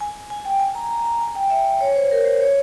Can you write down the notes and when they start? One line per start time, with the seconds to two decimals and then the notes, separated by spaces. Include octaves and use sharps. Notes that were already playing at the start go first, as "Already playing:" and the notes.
0.01 G#5
0.30 G#5
0.45 G5
0.60 G#5
0.75 A#5
0.91 A#5
1.06 A#5
1.21 G#5
1.35 G5
1.50 E5
1.81 C#5
1.96 C5
2.11 A#4
2.26 C5
2.41 C#5